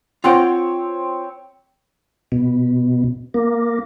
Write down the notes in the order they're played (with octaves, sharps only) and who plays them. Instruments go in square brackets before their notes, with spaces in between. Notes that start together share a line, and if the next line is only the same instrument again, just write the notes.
[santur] C4 C#5 [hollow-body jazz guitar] F4 F#5 G5
[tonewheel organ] B2
A#3